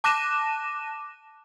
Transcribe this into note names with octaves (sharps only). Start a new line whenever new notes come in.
A5 D6 F#6 A#6 D#7 E7